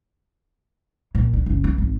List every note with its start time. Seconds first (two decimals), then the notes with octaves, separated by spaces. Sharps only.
1.15 A#2
1.33 D3
1.46 F#1
1.64 B3
1.78 G#1